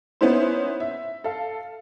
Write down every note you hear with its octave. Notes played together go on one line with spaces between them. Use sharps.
B3 C#4 D#4 E4 C5
E5
A4 F5